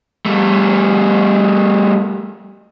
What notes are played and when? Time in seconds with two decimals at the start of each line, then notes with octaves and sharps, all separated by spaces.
0.26 G3 A3